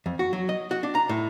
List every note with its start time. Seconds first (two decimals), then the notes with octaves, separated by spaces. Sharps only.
0.06 F2
0.19 F#4
0.33 F#3
0.49 D#5
0.71 F#4
0.83 D4
0.95 A#5
1.09 A2